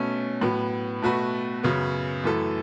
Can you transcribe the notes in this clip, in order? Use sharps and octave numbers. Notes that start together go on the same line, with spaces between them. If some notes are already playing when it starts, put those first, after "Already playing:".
Already playing: B2 A3 C#4
A2 F#3 B3
B2 A3 F#4 B4
F#2 C#3 F#3 B3
F#2 E3 A3 E4 A4